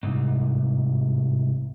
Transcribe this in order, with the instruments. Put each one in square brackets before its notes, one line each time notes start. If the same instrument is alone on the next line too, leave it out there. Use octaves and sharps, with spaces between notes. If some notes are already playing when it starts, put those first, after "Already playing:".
[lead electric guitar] C2 G#2